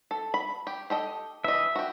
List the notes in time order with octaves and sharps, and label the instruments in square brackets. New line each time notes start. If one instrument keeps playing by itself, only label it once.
[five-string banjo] A4
B5
G4
G4 A4 D#5
[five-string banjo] E3 D#5 [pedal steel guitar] E5
[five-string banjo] F#4 G4